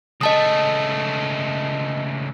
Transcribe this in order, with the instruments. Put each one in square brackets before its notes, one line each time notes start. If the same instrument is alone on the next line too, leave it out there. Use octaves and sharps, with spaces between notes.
[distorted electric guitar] C#2 A3 [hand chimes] D#5 A5 D#6